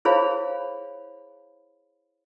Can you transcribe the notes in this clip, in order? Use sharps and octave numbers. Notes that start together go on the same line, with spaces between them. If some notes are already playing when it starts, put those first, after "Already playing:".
E4 G#4 C5 C#5 F5 B5